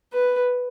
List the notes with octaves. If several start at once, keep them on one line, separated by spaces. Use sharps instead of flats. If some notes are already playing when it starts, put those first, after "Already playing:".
B4